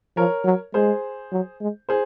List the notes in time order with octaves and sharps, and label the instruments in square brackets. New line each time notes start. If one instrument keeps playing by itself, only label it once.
[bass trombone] F3 [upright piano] A#4 C#5
[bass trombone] F#3
[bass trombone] G#3 [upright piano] G#4 C5
[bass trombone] F#3
G#3
[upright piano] G#4 C5